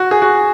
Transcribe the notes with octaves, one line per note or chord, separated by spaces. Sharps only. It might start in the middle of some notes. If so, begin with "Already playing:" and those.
Already playing: F#4
G#4
F#4